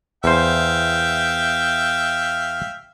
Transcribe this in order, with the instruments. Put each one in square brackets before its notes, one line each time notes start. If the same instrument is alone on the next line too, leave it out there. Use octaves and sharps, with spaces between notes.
[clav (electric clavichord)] E2 C5 [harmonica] E5 F5 G5